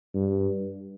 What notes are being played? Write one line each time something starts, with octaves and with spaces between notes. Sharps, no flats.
G2